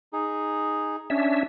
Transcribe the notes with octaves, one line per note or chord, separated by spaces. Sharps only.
D#4 G#4
C#4 D4 E5